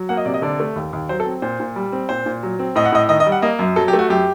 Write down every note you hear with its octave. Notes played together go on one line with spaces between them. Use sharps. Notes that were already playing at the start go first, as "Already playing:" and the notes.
Already playing: F#3
A#3 F#5
D#5
C3 D5
D#5
D3 D5
A3
D#2
D#2
F#3 C5
A4
C4
A#2 C5
A#2
G3
C4
A#2 C5
A#2
F#3
C4
A2 D#5
F#5
A2 D#5
D#3 D#5
D#5
G3
F#5
A#3 D#5
F#2
F#3 A4
G4
A3
F#4
F#2 G4